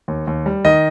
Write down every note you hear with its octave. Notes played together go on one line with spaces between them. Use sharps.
D#2
D#2
G3
D#3 D#5